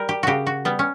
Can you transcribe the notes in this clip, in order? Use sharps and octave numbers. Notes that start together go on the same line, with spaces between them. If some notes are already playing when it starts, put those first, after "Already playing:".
Already playing: G3 A#4
G4
C#3 F#4 G4
F#4
G3 B3
C#4